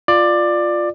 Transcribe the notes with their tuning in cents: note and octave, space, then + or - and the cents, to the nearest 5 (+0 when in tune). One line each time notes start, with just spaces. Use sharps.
F4 +0 D5 +15